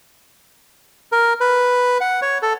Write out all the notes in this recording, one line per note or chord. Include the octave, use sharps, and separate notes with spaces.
A#4
B4
F#5
C#5
A4